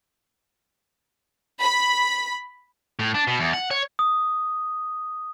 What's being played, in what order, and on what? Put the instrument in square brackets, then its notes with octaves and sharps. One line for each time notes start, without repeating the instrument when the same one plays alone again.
[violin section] B5
[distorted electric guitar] A2
D4
B2
E2
F#5
C#5
[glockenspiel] D#6